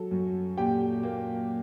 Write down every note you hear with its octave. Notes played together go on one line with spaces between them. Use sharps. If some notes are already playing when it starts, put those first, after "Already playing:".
Already playing: F#3 A4
F#2
A#2 G4 G5
A#3